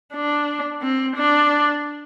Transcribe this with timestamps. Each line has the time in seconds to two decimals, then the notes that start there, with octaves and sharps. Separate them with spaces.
0.14 D4
0.82 C4
1.16 D4